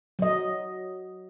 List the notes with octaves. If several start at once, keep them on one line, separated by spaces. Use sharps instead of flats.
F#3 D#5